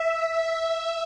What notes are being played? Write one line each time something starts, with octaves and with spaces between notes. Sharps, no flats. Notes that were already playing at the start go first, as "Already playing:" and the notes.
Already playing: E5
E5